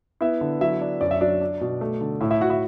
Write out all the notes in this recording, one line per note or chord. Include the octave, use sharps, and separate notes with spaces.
B3 E4 E5
D3
F#3 E4 E5
D4
F#2 D5
E5
F#3 D4 D5
D4
B2
A3
D3
A2 E4 E5
E4 E5
A2 F#4 F#5
E4 E5